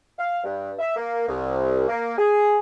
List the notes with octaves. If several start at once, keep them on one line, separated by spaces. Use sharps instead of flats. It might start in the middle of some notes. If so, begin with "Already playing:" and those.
F5
G2
E5
A#3
C2
A#3
G#4